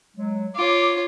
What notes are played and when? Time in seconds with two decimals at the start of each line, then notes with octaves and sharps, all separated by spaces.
0.17 F#3 G#3
0.56 F4 C#5 D6